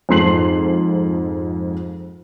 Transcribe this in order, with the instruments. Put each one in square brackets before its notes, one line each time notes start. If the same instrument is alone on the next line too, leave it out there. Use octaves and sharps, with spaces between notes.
[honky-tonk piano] F2 G#2 C6 C7 F#7